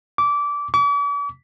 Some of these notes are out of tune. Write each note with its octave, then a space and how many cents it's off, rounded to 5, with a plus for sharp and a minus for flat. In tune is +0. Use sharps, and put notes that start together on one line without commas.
D6 -20
D6 -45